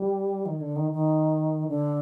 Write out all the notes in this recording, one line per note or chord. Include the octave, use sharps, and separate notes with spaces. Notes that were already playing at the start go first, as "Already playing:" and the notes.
Already playing: G3
D#3
D3
D#3
D#3
D3